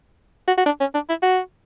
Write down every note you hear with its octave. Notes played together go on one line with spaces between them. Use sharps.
F#4
F#4
D4
C#4
D4
E4
F#4